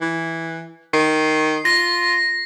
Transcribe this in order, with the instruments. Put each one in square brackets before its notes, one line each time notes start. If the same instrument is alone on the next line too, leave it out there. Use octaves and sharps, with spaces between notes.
[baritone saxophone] E3
[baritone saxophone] D#3 [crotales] C7
[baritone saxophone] F4 [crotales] A#6